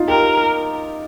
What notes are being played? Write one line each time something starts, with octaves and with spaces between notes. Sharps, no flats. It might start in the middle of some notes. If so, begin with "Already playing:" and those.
Already playing: D#4 F4
G4 A#4